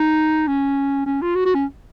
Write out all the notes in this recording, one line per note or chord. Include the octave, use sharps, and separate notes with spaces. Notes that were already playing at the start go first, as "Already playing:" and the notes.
Already playing: D#4
C#4
C#4
F4
F#4
F#4
C#4